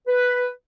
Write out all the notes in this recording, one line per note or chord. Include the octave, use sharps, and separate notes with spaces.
B4